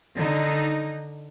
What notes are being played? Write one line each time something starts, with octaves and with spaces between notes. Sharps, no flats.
D3 D#4